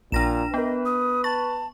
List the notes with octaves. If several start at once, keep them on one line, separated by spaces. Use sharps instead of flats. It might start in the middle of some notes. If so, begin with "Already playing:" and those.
A#1 A#2 D4 A#5 A#6 E7
B3 A#4 B4 D#5 G5
D#6
A5 C#6 A6